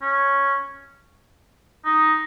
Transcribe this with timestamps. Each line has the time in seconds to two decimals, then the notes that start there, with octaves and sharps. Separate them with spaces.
0.02 C#4
1.85 D#4